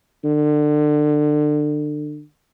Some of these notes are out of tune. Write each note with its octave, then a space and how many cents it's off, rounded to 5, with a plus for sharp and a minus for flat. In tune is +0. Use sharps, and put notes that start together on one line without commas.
D3 +30